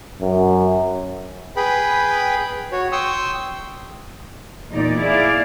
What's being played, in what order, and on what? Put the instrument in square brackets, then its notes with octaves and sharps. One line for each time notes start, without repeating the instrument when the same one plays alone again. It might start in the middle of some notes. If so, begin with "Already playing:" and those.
[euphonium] F#2
[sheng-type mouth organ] G#4 B4 G5 B5
F#4 C#5
G5 C6 C#6 D#6 E6
[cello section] E2 A#2 D#4 D5
E4 G#4 D5 F5